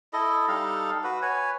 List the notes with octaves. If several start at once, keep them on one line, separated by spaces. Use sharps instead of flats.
E4 A4 D#5
G3 D#4 A4 F5
F#4 B4
B4 C#5 G#5